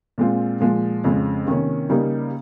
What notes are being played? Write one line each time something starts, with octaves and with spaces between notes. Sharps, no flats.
A#2 G#3 C4 F4
A#2 F3 G#3
F2 C#3 G#3
C3 D#3 A#3 C#4
C#3 G3 A#3 D#4